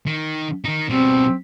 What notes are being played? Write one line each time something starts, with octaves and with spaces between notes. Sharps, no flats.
D#3
D#3 D#4
B2 G3 C4